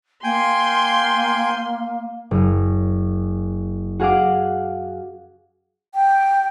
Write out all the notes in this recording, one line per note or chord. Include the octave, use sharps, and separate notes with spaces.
A#3 G5 G#5 C6
F#1
F#4 G#4 F5 F#5 D6
G5